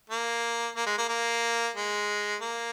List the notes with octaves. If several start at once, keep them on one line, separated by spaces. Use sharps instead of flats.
A#3
A#3
G#3
A#3
A#3
G#3
A#3